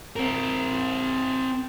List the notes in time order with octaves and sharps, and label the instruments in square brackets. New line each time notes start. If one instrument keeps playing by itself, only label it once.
[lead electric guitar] C4 A#4